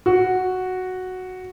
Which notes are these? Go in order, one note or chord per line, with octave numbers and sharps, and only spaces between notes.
F#4